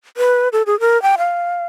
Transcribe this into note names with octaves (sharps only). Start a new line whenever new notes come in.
B4
A4
G#4
A#4
G5
F5